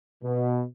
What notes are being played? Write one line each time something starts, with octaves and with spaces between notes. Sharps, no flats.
B2